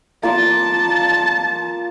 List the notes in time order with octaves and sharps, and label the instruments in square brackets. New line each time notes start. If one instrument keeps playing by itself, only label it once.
[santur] A#3 F4 D5 [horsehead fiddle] A5